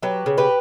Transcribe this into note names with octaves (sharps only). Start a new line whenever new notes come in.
F#3 G4 B4
C#3
G4 B4